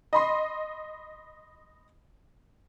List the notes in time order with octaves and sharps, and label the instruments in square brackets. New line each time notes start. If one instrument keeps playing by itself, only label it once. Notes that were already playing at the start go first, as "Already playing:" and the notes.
[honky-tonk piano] D#5 B5 C6